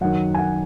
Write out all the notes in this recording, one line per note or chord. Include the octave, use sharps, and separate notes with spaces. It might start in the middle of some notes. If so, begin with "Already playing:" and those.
F#2 D#3 F#5
G#5
F#5